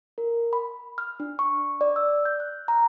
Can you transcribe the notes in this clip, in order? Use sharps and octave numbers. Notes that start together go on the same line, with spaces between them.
A#4
B5
F6
D4
C#6
D5
E6
G6
F#6
A#5